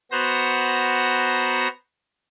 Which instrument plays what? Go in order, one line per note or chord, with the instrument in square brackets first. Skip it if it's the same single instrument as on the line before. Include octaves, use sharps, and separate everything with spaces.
[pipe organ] B3 F#4 C5 A#5 A#6